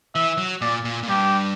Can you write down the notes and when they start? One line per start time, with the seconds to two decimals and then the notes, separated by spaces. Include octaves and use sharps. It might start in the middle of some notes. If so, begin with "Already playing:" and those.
0.14 E3 E5
0.38 F#3
0.61 A#2 D5
0.85 A#2
1.03 A#2
1.08 G2 G4